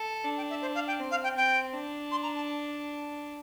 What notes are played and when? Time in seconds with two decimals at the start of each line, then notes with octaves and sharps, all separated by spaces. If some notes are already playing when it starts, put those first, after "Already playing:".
Already playing: A4
0.24 D4 A5
0.37 G5
0.50 E5
0.62 C5
0.75 F5
0.87 G5
0.99 C4
1.11 F5
1.24 G5
1.36 C4 G5
1.74 D4
2.11 C6
2.23 A#5
2.36 A5